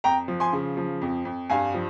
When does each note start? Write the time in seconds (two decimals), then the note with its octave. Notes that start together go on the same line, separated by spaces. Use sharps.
0.04 F2 G5 A#5
0.28 F3
0.40 G#5 C6
0.53 C#3
0.77 F3
1.02 F2
1.25 F2
1.50 G2 F5 G#5
1.74 F3